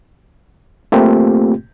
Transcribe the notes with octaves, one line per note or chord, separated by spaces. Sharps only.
A3 A#3 C4 F4 G4